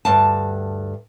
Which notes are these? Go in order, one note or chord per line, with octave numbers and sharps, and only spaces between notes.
D2 G2 A5